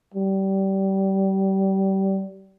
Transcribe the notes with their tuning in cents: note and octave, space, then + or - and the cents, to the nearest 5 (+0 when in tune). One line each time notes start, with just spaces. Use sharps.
G3 -25